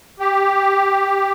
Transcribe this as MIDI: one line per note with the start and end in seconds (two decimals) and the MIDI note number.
0.19 1.33 67